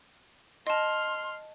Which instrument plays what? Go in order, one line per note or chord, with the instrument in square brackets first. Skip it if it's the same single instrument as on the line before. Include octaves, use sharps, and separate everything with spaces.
[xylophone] D#5 A5 [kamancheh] C6 F6